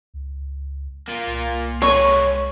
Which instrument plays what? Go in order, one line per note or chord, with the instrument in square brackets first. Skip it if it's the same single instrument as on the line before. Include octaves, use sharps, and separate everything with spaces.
[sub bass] C#2
[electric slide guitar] A#3 F4
[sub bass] C2
[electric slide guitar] G#3 B4 [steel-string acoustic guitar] C#5 [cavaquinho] C#6